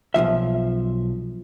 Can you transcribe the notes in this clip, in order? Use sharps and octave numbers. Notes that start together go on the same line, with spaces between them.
B1 C#3 F3 E5